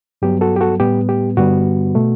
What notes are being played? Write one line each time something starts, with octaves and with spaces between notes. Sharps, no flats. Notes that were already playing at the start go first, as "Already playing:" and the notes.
G2 F#3 B3 G4
F#4 A4
G4
F#4 A4
A2 G3 B3 G4
G4
G2 D3 G3 B3 F#4
B2 A3